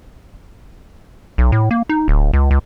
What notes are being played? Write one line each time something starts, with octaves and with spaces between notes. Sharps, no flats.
B1
A2
A#3
D#4
D1
C#2
C#2